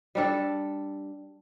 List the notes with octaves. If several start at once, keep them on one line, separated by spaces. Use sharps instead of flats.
G3 D4 A4